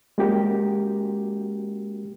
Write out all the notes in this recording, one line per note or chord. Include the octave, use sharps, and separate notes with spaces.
G#3 A#3 C#4 F#4 G4 A#4